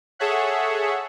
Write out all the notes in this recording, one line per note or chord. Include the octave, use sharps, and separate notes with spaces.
G#4 A4 C#5 E5 F#5